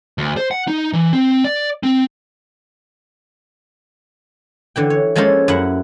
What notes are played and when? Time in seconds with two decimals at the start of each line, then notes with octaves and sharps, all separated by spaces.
0.18 D2
0.37 C5
0.51 F#5
0.68 D#4
0.93 E3
1.13 C4
1.44 D5
1.83 C4
4.76 D3 E3 G5
4.90 C#5
5.16 F3 G#3 A#3 C#4 A4 C5
5.48 F#2 E4 F#5